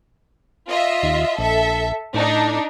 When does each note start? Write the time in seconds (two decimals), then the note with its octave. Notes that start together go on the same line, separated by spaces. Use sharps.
0.68 F4 D#5 E5
1.03 D#2
1.38 A#1 A4 E5
2.14 A2 D4 D#4